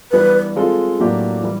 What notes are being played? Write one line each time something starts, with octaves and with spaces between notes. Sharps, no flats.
E3 G3 B3 D4 B4
G#3 C4 F4 A4
A2 F#3 A#3 D4 G4
E3 G3